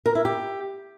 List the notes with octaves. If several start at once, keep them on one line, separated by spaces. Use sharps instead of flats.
A#4
E4
G4